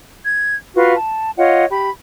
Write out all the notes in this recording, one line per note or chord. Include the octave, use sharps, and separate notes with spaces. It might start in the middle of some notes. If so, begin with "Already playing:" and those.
G#6
F4 F#4 B4 F5
A5
F4 C#5 D#5 F#5
G4 B5